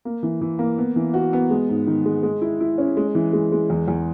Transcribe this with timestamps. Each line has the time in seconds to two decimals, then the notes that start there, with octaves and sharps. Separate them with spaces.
0.05 A#3
0.23 E3
0.41 E3
0.59 A#3
0.78 B3
0.96 E3
1.14 F#4
1.33 B3
1.50 G#3
1.69 G#2
1.87 D#3
2.05 G#3
2.23 G#3
2.41 E4
2.60 E4
2.78 C#4
2.97 G#3
3.15 E3
3.33 G#3
3.52 G#3
3.70 E2
3.88 E2